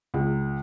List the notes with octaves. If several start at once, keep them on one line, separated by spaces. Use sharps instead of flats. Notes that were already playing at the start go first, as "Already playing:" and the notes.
C#2